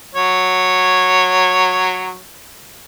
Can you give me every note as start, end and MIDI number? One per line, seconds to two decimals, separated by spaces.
0.15 2.20 54
0.15 2.20 73